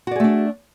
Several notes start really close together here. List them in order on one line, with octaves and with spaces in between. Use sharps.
F#4 D5 G#4 A3 D4